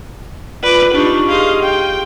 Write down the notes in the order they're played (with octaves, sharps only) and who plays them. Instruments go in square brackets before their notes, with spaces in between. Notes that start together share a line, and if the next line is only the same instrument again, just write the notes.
[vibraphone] F4 D5 [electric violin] B4 D6
[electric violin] D4 D#4 [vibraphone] F4 G4 C#6
[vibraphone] G4 G#4 C6 [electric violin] D#5 F5
[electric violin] G5